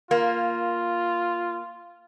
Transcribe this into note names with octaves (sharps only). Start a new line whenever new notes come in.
A#3 F4